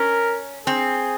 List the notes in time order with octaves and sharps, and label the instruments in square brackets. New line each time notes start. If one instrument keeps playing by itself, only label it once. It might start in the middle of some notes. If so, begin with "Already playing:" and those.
Already playing: [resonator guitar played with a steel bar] C#4 [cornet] A#4
[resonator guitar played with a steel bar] C4 [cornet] G#4